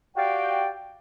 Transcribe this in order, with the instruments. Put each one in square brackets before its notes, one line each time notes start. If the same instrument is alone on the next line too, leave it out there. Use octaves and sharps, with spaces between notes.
[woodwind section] F#4 G4 D5 F5 G5